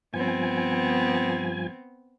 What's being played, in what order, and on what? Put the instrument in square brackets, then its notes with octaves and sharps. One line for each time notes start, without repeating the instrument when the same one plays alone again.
[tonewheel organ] G2 F3 G#5 [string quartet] B3 C4